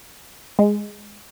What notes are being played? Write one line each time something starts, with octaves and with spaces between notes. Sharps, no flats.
G#3